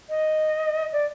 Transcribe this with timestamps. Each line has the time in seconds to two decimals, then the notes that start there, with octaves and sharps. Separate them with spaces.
0.09 D#5
0.93 D5